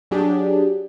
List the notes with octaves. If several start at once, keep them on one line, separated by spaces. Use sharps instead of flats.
F#3 D4 G4 G#4